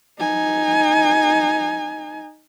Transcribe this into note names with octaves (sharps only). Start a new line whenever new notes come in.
D#4 G#5